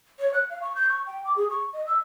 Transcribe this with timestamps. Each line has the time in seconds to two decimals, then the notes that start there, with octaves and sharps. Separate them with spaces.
0.19 C#5
0.34 F#6
0.50 F5
0.62 C#6
0.75 G6
0.89 C#6
1.07 G5
1.25 D6
1.36 G#4
1.50 C#6
1.73 D#5
1.87 E6